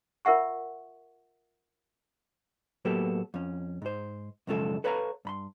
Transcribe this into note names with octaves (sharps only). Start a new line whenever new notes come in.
F4 A#4 E5 F#5 C#6
A2 F#3 A#3 B3 G4 A4
F2 C#4
G#2 C5
B1 F#2 C#3 F3 G#3 A4
A4 B4 C#5 F5 A5 A#5
G2 B5 C6